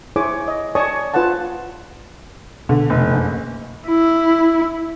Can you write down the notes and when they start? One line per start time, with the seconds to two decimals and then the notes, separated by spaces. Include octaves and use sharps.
0.16 E4 G#4 C5 C#5 G#5 D6
0.48 D#5
0.75 C#5 D5 G#5 A5 C#6 D#6
1.14 F4 B4 C5 F#5 A5
2.69 B2 D3
2.90 F1
3.12 F#1
3.87 E4